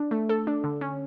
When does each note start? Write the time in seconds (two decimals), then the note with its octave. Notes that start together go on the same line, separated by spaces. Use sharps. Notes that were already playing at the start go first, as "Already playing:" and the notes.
Already playing: D4
0.11 A3
0.29 A4
0.47 D4
0.64 D3
0.81 C#4